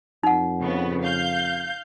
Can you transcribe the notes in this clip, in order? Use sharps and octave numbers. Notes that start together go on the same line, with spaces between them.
F2 D#4 F#5
C#3 B3
F5 G6